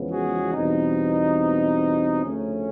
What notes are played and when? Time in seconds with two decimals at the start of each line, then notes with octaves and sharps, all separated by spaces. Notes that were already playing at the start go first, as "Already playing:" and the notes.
Already playing: E2 C#3 F3 G#3 B3
0.10 F#4 G#4
0.53 E2 B2 G3 C4 D#4
2.23 D2 C#3 F3 A3 C#4